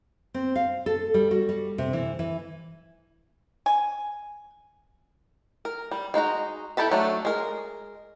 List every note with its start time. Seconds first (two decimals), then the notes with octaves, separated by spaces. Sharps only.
0.34 C4
0.56 F5
0.86 A4
1.14 G3
1.31 F#4
1.49 G3
1.78 C3
1.93 E3
2.19 E3
3.66 G#5
5.65 A#4
5.91 G3
6.14 G#3 D#4 F#4 A#5
6.77 E4 G4 A4 A5 B5
6.91 F#3 A3 D4
7.25 G#3 A#4